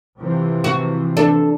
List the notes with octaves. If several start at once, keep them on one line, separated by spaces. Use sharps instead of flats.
C3 E3 F3
F#4
D4 A4